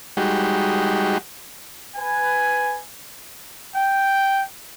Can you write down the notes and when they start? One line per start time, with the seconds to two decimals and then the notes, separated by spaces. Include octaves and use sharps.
0.17 G3 G#3 D#4 F#4 G4
1.97 B4 G#5
3.76 G5